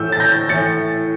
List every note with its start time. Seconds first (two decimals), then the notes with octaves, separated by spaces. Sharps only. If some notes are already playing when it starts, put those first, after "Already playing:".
Already playing: A2 E3 E6 G6
0.12 A6
0.20 G6 A#6
0.49 A2 E3 A6 C#7